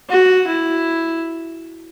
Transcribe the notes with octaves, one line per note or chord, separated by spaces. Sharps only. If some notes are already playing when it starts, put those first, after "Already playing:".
F#4
E4